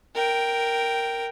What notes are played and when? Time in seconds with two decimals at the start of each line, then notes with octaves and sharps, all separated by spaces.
0.15 A#4 G5